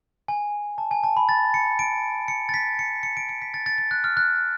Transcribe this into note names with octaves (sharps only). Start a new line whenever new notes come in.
G#5
A5
G#5
A5
B5
A6
C#7
D7
C#7
A6
B6
C#7
C#7
D7
C#7
B6
A6
A6
A6
F#6
F6
F#6